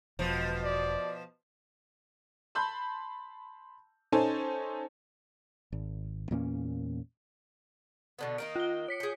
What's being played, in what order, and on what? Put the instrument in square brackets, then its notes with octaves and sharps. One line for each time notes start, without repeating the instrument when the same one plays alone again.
[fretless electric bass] E1 [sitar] B2 F3
[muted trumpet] D5
[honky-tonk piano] A5 B5 C6 G6
C#4 D#4 A4 C5 G#5 A5
[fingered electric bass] G#1
E2 A#2 A#3 C#4
[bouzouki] B2 D3 B3
[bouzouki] D#3 A#3 D#4 [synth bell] D7
[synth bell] F4 G7
C#5 B6 C#7
[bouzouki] G#4 G5